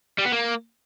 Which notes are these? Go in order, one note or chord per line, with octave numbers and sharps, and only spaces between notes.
G3
B3
A#3